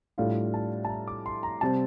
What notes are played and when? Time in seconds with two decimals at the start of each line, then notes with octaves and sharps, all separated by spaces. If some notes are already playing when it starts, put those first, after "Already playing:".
0.18 A2 G3 D4 F4 F5
0.54 A5
0.85 A5
0.89 A#5
1.08 D6
1.26 C6
1.43 A#5
1.61 C3 G3 C4 A5